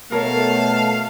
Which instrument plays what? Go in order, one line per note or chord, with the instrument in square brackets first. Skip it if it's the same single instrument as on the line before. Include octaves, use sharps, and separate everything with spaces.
[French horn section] B2 A3 [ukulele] A#4 C#5 [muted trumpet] F5 [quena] A5